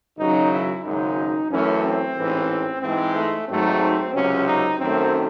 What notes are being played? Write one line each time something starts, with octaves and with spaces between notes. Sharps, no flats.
G#1 F#2 C#3 F#3 D#4
E4
G#1 F#2 C#3 G#3 D#4
F#2 E3 A3 C#4
C4
A1 G#2 E3
G#2 E3 G#3 C4
A3
G#1 G#2 D#3 F#3 A3 C4
C#2 C3 F#3 C#4
D#4
F#2 D#3 F#3 A3 C4